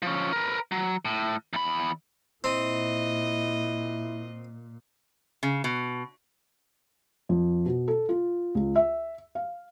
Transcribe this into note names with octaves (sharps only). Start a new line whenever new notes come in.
F3 C#4
A#4 B4
F#3
A2
E2 B5
A#2 C4 E4 D#5
C#3
B2
F2
B2
A4
F4
C#2
E5
F5